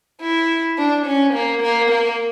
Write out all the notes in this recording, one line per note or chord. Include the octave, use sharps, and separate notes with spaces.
E4
D4
C#4
A#3
A#3
A#3